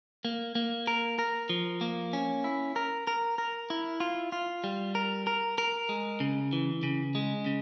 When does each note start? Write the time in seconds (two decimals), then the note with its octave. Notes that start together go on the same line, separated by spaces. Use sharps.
0.25 A#3
0.55 A#3
0.87 A#4
1.19 A#4
1.49 F3
1.81 A#3
2.13 C#4
2.44 E4
2.76 A#4
3.07 A#4
3.38 A#4
3.70 E4
4.00 F4
4.32 F4
4.64 G3
4.95 A#4
5.27 A#4
5.58 A#4
5.89 G#3
6.20 C#3
6.53 E3
6.83 C#3
7.15 G#3
7.46 C#3